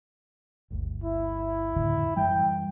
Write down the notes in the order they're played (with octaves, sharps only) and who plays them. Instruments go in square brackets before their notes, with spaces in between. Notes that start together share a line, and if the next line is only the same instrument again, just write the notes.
[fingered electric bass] G1 D2
[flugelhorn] E4
[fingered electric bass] F2 A2 D3
[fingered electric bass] F#2 E3 G3 [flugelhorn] G5